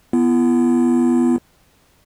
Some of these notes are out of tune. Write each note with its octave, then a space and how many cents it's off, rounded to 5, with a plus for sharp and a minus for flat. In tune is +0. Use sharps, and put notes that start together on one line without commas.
B3 +0 E4 +45